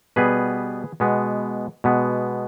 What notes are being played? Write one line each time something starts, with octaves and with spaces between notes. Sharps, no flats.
B2 G3 B3 G#4 B4
B2 G#3 B3
B2 G#3 B3